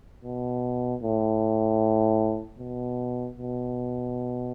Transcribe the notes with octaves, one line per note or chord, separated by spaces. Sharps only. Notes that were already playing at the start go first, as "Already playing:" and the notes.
B2
A2
B2
B2